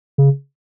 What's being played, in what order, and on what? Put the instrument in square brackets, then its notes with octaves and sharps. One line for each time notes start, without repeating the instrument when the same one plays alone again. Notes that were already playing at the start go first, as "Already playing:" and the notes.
[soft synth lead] C#3